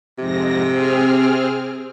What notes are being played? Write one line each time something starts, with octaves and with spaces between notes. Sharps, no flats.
F2 G#2 C3 A#6
C4 G#4 F6